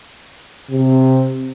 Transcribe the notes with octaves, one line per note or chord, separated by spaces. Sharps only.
C3